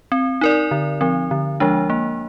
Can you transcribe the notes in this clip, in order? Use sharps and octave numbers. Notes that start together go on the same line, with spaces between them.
C4
D#4 A#4 D5
D3
F3 C4
D3
F3 G#3 D4
A#3